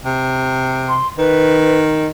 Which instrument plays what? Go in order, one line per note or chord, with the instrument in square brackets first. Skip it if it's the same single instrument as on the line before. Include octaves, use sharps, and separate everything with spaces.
[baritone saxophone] C3
[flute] C6
[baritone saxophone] D#3 [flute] B4